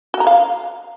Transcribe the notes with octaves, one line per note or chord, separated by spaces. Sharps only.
F#4
A#5
F5